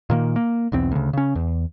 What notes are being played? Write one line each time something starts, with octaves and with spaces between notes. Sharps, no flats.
A#2 D#3 A#3
A#3
B1 E2 C4
D2 C#3
C#3 C#4
E2